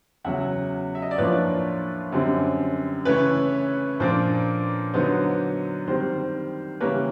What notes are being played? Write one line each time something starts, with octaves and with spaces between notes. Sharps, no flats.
E2 C#3 F#3 E5 F#5
E5
D#5
D5
A2 F3 A#3 D4 F4 B4 C#5
F#2 D3 G3 C4
C#3 E3 A3 C#4 B4 C#5
A#2 F3 A#3 D4 C5
D3 F#3 B3 D#4 C5
D#3 G3 C4 C5
C#3 E3 G3 A#3 B4 C#5